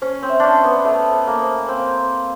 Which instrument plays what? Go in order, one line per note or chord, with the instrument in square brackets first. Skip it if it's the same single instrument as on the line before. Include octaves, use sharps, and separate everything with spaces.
[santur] C#4 [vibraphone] C5
[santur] C4
[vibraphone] E5
[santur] C#4 D4
[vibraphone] C5
[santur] B3
[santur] A3 [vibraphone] E5
[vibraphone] C5
[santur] A#3
[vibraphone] C5
[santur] C4 [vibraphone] F5
[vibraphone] F5